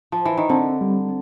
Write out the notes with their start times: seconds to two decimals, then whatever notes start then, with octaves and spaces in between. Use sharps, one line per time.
0.12 F3
0.25 E3
0.37 D#3
0.49 D3 C4
0.81 G3